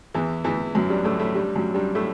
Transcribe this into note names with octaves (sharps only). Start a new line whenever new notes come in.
E2 E3
E2 E3
F#2 F#3
G2 G3
A2 A3
A2 A3
G2 G3
F#2 F#3
G2 G3
A2 A3